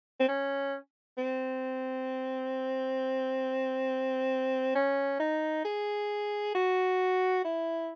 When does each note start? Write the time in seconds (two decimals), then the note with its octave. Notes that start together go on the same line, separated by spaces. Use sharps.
0.20 C4
0.28 C#4
1.18 C4
4.75 C#4
5.20 D#4
5.65 G#4
6.55 F#4
7.44 E4